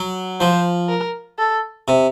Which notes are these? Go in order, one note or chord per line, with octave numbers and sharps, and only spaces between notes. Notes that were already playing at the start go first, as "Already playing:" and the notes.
Already playing: F#3
F3 C5
A#4
A4
C3